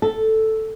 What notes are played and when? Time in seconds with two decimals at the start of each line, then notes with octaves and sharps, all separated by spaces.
0.02 A4